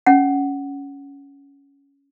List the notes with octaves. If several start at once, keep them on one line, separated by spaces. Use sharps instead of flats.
C#4 F#5